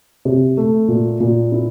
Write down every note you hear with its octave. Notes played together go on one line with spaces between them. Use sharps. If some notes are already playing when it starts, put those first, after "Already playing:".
C3
A3
A#2
A#2
E4